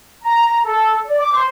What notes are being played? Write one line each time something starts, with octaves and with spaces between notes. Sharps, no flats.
A#5
A4
D5
D6
C5